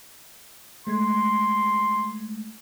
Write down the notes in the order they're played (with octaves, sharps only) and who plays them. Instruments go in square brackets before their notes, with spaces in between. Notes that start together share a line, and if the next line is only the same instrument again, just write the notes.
[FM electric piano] G#3 A3 G#6 [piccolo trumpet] C6